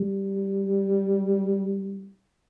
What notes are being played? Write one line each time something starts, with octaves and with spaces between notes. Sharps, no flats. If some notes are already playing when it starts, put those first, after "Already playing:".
Already playing: G3